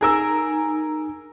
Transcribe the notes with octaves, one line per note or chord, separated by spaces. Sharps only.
D#4 G#4 A#4 E6